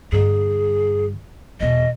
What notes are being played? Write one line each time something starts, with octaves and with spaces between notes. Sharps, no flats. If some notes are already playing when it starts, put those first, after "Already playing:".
G2 D3 G#4
E2 B2 D#5